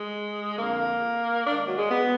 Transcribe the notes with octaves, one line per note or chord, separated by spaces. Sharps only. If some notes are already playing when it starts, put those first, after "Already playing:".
Already playing: G#3
F2 D3 A#3
G#2 D#3 D4
F#3
G#3
B3